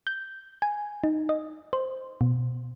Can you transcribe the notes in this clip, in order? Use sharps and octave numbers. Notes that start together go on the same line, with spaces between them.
G6
G#5
D#4
D#5
C5
B2